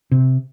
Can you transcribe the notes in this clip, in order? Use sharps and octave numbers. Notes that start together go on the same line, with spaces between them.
C3